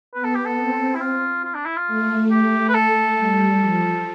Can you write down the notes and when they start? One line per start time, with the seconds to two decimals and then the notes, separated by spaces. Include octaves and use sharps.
0.14 B3 B4
0.24 A4
0.35 G4
0.45 A4
0.58 C4
0.95 E4
1.01 F4
1.45 F4
1.55 D4
1.66 E4
1.77 F4
1.87 A3
2.31 G4
2.69 B4
2.74 A4
3.18 G3
3.61 F3